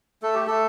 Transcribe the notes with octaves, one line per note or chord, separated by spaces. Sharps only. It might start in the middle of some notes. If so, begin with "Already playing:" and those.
A3 A4
G4
A3 A4